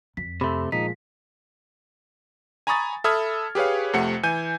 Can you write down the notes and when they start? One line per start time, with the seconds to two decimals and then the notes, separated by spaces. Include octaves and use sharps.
0.17 F2 B6
0.41 C3 A3 B5 C6 E6
0.72 A#2 F3 G#3 D#4 B6
2.67 G#5 A#5 B5 C#6 D#6 A6
3.04 A4 E5 B5 D#6 F6 G#6
3.55 G4 G#4 B4 C#5 F5
3.93 F2 C3 A3 F#5 C#7
4.23 E3 G#5 G6 D#7